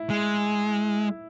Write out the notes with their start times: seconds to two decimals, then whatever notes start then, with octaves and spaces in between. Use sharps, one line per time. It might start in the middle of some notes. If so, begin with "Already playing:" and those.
Already playing: E4
0.10 G#3